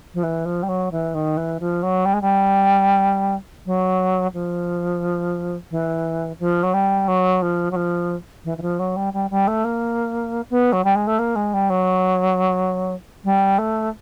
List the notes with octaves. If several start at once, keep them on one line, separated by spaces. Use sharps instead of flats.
F3
E3
F3
G3
F#3
E3
D#3
E3
F3
F#3
G3
G#3
G3
F#3
F3
E3
F3
F#3
G3
F#3
F3
F#3
F3
E3
E3
F3
F#3
G3
G3
G3
A3
A#3
B3
F#3
G3
G#3
A3
A#3
G#3
G3
F#3
G3
A3